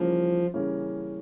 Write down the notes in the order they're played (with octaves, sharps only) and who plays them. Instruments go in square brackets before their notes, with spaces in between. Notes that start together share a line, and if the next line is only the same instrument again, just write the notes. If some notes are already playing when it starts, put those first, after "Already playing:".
Already playing: [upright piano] C#3 E3 G3 A#3 C#4 [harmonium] F3
[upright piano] C#3 E3 G3 A#3 C#4